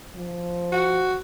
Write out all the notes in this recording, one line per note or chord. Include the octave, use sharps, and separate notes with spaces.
F3
F#4